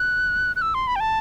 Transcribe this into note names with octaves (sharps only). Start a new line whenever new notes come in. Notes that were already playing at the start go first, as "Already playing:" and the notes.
Already playing: F#6
F#6
E6
C6
B5
G5
A5